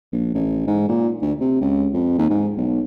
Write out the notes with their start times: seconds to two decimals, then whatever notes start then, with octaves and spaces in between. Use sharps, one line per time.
0.12 A#1
0.34 A1
0.67 G#2
0.89 A#2
1.22 D2
1.40 C3
1.61 C#2
1.94 F2
2.18 D#2
2.30 G#2
2.57 B1